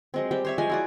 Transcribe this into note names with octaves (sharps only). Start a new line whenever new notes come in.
F#3 G#3 C4
G3 C4 G4
C5 C#5 E5
F3 G#3 G#5
E4 F#4 D5